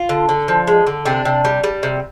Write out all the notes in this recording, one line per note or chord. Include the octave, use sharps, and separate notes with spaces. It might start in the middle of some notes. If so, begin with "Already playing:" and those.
Already playing: F4
D3
D3
F3
G#3
D3
C3 D4
C3
G3
G3
C3